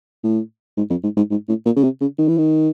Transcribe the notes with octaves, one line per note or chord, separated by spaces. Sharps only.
A2
G#2
F2
G#2
G#2
G#2
A2
A#2
C#3
C3
C#3
D#3
E3
D#3